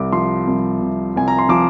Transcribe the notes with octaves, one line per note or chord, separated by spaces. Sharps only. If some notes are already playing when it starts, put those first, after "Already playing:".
Already playing: C2 C3 D6
F3 C6
C2
C3
C2 G#5
A#5
C6
F3 D6